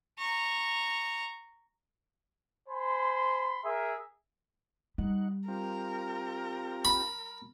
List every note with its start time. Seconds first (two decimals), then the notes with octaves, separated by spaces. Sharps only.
0.19 A#5 C#6
2.69 C5 G#5 B5 C6
3.64 G#4 A#4 E5
4.98 G3 D#4 F#5
5.48 C4 F4 G4 A#4
6.85 B5